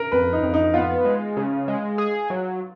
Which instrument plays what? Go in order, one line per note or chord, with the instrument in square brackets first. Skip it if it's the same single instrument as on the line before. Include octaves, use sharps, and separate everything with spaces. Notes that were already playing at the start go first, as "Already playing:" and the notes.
Already playing: [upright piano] A#4
[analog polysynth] F2 [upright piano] B4
[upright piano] D#4
[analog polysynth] F2
[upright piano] D#4
[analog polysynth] B3 [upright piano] F4
[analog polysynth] G#3
C#3
G#3
G#4
F#3